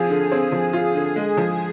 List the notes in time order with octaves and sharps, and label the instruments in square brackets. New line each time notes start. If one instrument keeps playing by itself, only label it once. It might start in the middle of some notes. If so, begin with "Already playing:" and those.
Already playing: [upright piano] F3 C4 F4 [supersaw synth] G#4
[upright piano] D3
C4
F3
F4
D3
G#3
F3